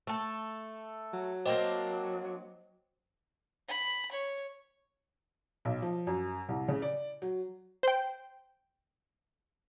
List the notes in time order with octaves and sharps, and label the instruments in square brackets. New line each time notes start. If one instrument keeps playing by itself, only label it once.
[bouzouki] A3 A4
[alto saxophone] F#3
[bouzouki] A#3 C4 D4 [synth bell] C5 D#5 G5
[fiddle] B5
C#5
[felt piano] B1
F3
F#2
C2
C#3
D5
F#3
[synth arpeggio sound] C5 G5